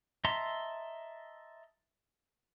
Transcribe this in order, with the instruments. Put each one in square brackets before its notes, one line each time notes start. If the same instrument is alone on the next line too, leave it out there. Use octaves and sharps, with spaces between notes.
[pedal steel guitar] D#5 E5 A5 A#5 C6